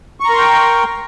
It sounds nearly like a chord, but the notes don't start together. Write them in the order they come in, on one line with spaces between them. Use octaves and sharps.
C#6 A#5 A#4 C6 G5